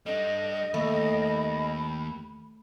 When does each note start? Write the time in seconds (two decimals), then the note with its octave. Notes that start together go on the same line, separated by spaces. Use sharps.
0.06 G3 D4 A4 D#5
0.74 D#2 A3 B5